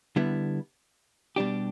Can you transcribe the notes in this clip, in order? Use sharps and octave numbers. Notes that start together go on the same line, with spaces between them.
D3 G3 B3 E4
B2 G3 D4 G4